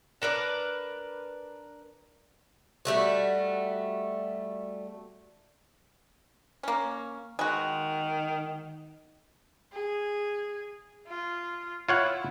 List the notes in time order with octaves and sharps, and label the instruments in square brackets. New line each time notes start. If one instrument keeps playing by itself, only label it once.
[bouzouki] D4 A#4 B4 D5
G3 A3 F#4
[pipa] A#3 C#4
[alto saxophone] D#3 [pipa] G#3 F#4
[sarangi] G#4
F4
[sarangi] E4 [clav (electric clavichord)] F4 C#5 F#5